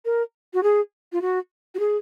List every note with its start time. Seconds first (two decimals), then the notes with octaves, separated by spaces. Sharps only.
0.05 A#4
0.54 F#4
0.63 G#4
1.12 F4
1.22 F#4
1.75 F#4
1.80 G#4